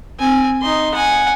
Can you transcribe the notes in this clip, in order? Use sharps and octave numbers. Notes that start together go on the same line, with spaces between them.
C4 G#5
D#4 C6
F#5 G#5